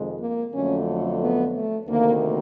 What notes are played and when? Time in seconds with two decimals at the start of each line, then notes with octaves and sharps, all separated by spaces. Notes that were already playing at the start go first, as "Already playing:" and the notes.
Already playing: F2 C3 D#3 G#3
0.20 A#3
0.54 F2 D3 F#3 A3 C#4
1.20 B3
1.54 A3
1.88 D2 C3 D#3 A#3